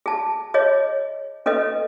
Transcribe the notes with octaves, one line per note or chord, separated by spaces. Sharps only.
G#4 A5
G#4 C#5 D#5
C#4 A4 B4 D#5